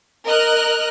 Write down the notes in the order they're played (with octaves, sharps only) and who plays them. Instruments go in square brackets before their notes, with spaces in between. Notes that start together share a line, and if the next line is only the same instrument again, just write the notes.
[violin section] A#4 D#5 F6 F#6